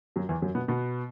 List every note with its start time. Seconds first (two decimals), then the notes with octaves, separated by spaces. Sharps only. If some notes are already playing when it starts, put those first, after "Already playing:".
0.16 F#2 F#3
0.29 E2 E3
0.42 F#2 F#3
0.55 B2 B3
0.68 B2 B3